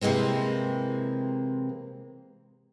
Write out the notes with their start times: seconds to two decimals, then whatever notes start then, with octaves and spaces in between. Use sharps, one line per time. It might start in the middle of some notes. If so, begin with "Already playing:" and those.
0.01 C3 E3 G#3 A#3 C4